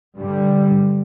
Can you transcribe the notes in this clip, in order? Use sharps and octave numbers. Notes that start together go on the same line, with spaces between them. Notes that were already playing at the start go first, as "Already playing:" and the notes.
G2 D3 G3